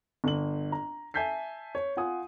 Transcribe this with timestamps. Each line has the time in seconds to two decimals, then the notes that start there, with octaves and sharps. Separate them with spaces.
0.24 G1 F#7
0.72 A#5
1.14 E5 G#5 A5 G6 B6 C7
1.75 C#5
1.97 F4 F#5 G#5 D#6